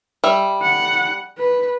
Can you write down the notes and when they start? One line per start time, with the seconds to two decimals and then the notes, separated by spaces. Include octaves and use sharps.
0.24 G3 E5
0.62 F#5
1.38 B4